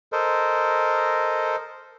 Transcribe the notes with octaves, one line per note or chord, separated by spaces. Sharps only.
A4 A#4 C5 D#5